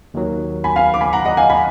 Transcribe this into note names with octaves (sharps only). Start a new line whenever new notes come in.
D#2 D#3 F#3
G#5 B5
F5 G#5
D6
G#5 B5
F#5 A#5
D#5 F#5
F5 G#5
G#5 B5